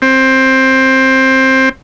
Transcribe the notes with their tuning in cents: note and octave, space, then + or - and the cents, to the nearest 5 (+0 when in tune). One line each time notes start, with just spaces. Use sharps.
C4 +15